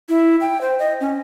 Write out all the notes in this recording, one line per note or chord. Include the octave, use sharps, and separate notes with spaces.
E4
G5
C5
D#5
C#4